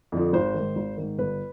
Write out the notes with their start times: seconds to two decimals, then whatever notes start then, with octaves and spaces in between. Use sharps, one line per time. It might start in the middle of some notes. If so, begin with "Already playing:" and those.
0.12 F2 D3 F3
0.33 G#1 C5
0.54 D#3
0.60 G#2
0.76 G#1
0.97 G#2 D#3
1.18 G1 B4